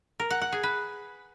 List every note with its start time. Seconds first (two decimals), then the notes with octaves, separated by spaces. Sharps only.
0.20 A#4
0.31 F#5
0.41 F#5
0.52 G#4
0.63 B4